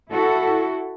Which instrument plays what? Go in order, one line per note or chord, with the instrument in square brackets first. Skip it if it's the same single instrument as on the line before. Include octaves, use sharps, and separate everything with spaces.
[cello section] E4 F#4 A4